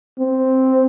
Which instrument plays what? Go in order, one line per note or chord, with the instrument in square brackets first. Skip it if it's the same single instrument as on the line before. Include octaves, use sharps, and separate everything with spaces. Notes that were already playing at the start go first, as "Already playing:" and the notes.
[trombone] C4